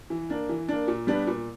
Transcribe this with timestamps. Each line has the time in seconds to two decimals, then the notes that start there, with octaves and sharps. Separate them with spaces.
0.10 E3
0.30 A#3 D4
0.49 E3
0.69 A#3 D4
0.88 A#2
1.07 G3 B3 D4
1.27 A#2